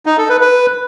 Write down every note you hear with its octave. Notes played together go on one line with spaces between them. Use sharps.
D#4
A4
B4
B4